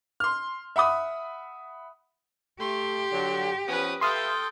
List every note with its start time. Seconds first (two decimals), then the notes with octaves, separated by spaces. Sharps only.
0.20 C6 F6
0.76 E5 F#5 B5 D#6
2.60 A3 G4 C6
3.12 D3 F#3
3.68 F3 B3 C#4 B4 D#6
4.01 A4 B4 E5 F5 G5 C6 D#6 F6